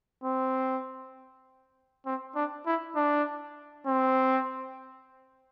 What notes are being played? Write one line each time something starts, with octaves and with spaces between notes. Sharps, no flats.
C4
C4
D4
E4
D4
C4